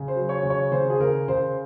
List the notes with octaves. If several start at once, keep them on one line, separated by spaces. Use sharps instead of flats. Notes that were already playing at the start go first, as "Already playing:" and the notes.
Already playing: C#3
C5
F#3
C#5
C#3
C#5
C#3 C5
G#4
C#3 A#4
C#3 C5